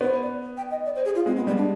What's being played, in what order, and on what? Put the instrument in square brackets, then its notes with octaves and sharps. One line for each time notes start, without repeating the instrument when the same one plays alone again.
[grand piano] B3 [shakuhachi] C5
[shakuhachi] D5
G5
D#5
D5
C5
G#4
F4
[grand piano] G#3 [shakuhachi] C4
[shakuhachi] B3
[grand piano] G3 [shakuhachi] B3
[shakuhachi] D4